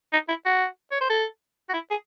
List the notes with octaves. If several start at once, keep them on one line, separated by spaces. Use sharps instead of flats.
D#4
E4
F#4
C#5
C5
A4
F#4
E4
G#4